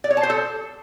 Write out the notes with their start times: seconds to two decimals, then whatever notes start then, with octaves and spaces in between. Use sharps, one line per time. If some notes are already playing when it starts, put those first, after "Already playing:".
0.04 D5
0.11 C#5
0.17 A5
0.23 C5
0.30 A4